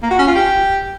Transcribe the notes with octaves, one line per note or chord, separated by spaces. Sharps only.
A#3
F#4
C#4
F4
G4